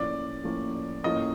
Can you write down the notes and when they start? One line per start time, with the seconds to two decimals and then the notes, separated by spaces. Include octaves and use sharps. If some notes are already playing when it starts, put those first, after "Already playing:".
Already playing: A2 F3 A#3 C#4 D5
0.43 A2 F3 A#3 C#4
1.04 A2 F3 A#3 C#4 D#5